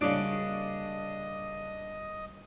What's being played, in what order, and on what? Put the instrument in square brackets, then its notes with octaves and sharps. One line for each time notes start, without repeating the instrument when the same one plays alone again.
[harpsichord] C#3 D6 [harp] G3 A#3 F#4 [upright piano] D4 [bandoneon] D#5 D#6